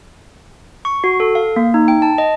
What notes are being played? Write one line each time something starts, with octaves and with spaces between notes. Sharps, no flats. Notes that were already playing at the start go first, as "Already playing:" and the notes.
C#6
F#4
A4
F5
A#3
D#4
G5
A5
D#5